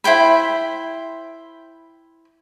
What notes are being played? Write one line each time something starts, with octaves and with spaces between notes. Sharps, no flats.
E4 C5 G5 B5